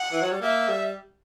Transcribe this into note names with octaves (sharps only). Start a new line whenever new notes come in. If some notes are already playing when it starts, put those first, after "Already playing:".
Already playing: F#5
E3
F#3
G3
A#3 E5
G3